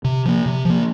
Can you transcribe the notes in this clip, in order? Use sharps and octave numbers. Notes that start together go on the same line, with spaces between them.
C3
F3 A#3
C3
F3 A#3